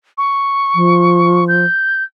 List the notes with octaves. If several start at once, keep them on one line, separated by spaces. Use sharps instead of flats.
C#6
F3
G6